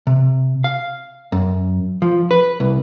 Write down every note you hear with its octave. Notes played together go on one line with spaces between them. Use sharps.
C3
F5
F#2
F3
B4
C2